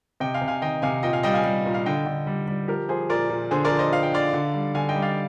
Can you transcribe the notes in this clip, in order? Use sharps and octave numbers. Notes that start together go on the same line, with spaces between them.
C3 D#5 G5
F5 G#5
C3
F5 G#5
D#3 D#5 G5
C3 F5 G#5
A#2 D#5 G5
F5 G#5
G3 D#5 G5
F5 G#5
G3
A#2
F5
D3 D#5 G5
D3
G3
G3
F3 G4 A#4
F3 G#4 C5
A#2 A#4 D5
A#2
D3 G#4 C5
A#4 D5
F3
C5 D#5
F3 F5
G5
D3 D5 F5
D3
G3
D3 F5 G#5
D#5 G5
G3
D5 F5